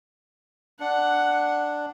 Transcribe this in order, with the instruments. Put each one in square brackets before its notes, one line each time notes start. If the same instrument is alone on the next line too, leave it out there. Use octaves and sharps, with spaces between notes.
[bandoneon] D4 [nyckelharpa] F#5